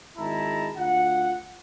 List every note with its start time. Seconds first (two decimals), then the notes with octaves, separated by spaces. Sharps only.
0.17 G#1 G#3 E4 A5 A#5
0.77 D2 F4 F#5